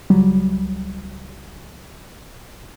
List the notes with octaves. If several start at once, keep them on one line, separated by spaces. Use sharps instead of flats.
C#2 F#3 G3